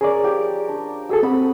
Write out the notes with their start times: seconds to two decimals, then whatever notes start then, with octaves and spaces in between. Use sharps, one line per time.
0.01 C#4 G#4 A#4 D5
0.23 F3 G4
0.69 D4
1.09 F#4 G#4 A4 E6
1.23 C4 F#4 B5 D#6